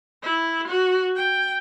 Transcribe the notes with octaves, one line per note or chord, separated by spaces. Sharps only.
E4
F#4
G5